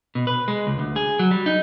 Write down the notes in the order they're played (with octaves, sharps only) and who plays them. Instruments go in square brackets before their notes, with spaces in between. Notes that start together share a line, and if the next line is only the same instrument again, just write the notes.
[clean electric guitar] B2
B4
G#3
C#2
D2
G#4
F#3
G3
D#4